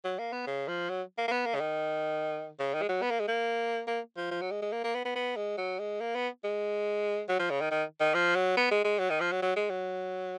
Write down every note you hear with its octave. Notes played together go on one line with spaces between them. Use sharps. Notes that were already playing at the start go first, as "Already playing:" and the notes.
F#3
A#3
B3
C#3
F3
F#3
A#3
A#3
B3
A#3
C#3
D#3
C#3
D#3
G#3
F#3
B3
A#3
G#3
A#3
A#3
F3
F3
F#3
G#3
G#3
A#3
A#3
B3
B3
B3
G#3
F#3
G#3
A#3
B3
G#3
F#3
F3
C#3
D#3
D#3
D#3
F3
F#3
B3
G#3
G#3
F#3
D#3
F3
F#3
F#3
G#3
F#3